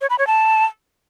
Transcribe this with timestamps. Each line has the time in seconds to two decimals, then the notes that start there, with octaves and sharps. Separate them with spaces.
0.01 C#5
0.10 B5
0.18 C#5
0.27 A5